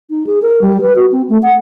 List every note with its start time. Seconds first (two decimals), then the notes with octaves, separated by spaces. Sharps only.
0.10 D#4
0.27 G#4
0.42 A#4
0.61 G3
0.81 B4
0.96 F#4
1.12 C4
1.29 A3
1.43 F#5